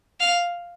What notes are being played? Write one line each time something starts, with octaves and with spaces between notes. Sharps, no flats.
F5